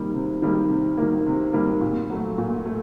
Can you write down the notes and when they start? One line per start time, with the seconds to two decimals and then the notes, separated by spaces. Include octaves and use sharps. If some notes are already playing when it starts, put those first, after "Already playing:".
Already playing: C3 D#3 G3 A#3
0.14 C3
0.42 D#3 G3 A#3
0.70 C3
0.98 D#3 G3 A#3
1.26 C3
1.53 D#3 G3 A#3
1.81 A#2
2.10 F#3 A3
2.38 A#2
2.66 A3